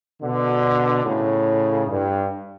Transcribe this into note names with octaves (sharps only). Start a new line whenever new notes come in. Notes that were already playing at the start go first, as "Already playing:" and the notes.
B2 D3
A2 C#3
G2